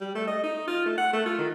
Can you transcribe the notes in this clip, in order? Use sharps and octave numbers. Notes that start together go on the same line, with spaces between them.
G3
A3
D#5
D#4
F4
A3
F#5
A3
F4
D#3